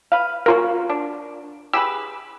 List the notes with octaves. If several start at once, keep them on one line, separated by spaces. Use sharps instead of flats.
B4 F5
A#3 C#4 F4 F#4 A#4
D4
G4 G#4 B4 E6